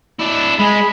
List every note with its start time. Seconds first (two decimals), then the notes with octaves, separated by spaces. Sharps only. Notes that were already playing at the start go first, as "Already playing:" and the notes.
0.20 D4 E4
0.59 G#3 G#4 B5